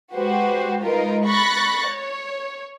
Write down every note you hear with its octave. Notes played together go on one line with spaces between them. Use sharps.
G#3 F#4 G4 B4 C5
G#3 D#4 F4 A#4 B4
B5 C#6 F#6 A6 A#6
C#5